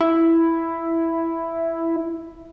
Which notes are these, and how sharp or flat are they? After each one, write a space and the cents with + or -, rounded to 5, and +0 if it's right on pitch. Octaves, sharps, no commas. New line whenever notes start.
E4 +5